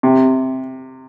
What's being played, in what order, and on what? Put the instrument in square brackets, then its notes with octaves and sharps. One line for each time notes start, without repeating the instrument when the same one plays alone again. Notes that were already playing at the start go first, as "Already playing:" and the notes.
[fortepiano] C3